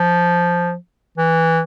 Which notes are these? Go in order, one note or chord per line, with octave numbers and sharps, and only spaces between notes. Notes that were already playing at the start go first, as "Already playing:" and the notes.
Already playing: F3
E3